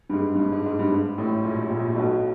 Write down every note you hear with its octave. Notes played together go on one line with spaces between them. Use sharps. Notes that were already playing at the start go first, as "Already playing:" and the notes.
G2
G#2
G2
G#2
G#2
G#2
G2
G#2
A1 A2
A#1 A#2
A#1 A#2
B1 B2